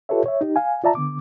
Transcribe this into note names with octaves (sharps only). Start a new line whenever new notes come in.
F4 G4 A4 B4 C#5 E5
C#5 E5
D#4 G4
F5 G#5
F4 D5 E5 A5 A#5
D3 B3 D6